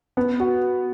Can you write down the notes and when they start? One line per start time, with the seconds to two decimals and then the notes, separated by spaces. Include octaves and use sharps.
0.17 B3
0.40 F#4